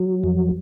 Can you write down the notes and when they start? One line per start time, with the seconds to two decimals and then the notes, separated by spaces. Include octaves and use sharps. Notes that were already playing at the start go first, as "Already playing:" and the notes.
Already playing: F#3
0.24 F2